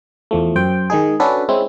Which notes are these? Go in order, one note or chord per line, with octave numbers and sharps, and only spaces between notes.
E2 F3 A3
F#2 C5 G5
D#3 G#3 D#4 G#4
C#4 D4 F#4 A4 B4
G#3 C4 C#4 E4